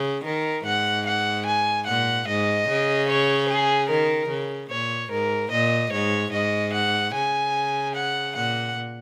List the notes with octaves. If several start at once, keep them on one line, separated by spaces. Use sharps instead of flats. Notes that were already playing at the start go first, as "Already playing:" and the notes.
Already playing: C#3
D#3 A#4
G#2 F#5
F#5
G#5
A#2 F#5
G#2 D#5
C#3
C#5
G#4
D#3 A#4
C#3
A#2 C#5
G#2 A#4
A#2 D#5
G#2 C#5
G#2 D#5
F#5
C#3 G#5
F#5
A#2 F#5